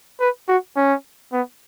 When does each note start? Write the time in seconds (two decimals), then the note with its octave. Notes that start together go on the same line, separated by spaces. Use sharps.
0.21 B4
0.48 F#4
0.77 C#4
1.33 B3